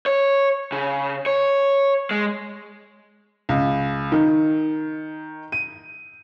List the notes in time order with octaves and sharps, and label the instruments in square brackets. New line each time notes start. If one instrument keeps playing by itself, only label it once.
[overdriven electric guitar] C#5
C#3
C#5
G#3
[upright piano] C#2
D#3
D#7